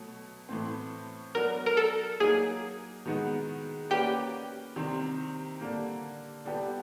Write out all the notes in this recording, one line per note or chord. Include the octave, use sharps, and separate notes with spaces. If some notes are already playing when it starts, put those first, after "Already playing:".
Already playing: B2 F#3 A3
A2 E3 A3 C4
F#3 B3 D4 F#4 A#4
A#4
A4
F#3 A#3 D#4 G#4
D#3 G#3 B3 D#4 F#4
A#3 C#4 F#4 G4 B4 D5
C3 D#3 G3 C4
D3 G3 A#3
D3 G3 B3 D4 G4